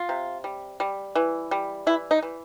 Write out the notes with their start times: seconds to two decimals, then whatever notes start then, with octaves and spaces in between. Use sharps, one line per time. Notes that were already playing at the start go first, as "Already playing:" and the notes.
Already playing: F4
0.09 C3
0.44 G3
0.80 G3
1.15 E3
1.51 G3
1.87 E3 E4
2.11 D#4
2.22 E3